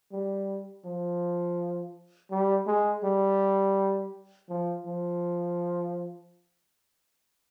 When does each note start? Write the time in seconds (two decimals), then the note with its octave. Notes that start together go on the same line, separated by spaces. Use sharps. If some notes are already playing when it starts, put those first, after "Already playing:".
0.12 G3
0.85 F3
2.31 G3
2.67 G#3
3.04 G3
4.49 F3
4.86 F3